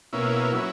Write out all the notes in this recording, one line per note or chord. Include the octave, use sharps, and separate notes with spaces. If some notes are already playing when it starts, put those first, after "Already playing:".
B2 A#3 C#4 E4
F#3 C#4 E4